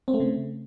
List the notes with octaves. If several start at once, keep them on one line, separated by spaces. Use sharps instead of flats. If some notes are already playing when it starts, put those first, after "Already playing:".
C4
A3
C#3